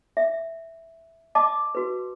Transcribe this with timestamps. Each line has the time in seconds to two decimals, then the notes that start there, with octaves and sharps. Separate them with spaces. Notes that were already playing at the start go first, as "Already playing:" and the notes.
0.17 E5
1.35 D#5 A5 D6
1.75 F#4 B4